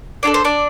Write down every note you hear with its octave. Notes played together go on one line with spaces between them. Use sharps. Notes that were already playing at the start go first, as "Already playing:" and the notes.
D4 F4 A4 D5
C5
D4 D5